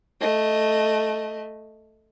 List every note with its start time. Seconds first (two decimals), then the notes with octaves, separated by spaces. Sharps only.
0.20 A3 D#5